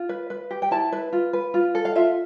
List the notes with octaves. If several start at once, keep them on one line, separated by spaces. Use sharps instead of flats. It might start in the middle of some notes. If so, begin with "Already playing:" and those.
Already playing: F4
B4
B4
G4
G5
E4 A5
B4
F4
B4
F4
A4
F5
F4 E5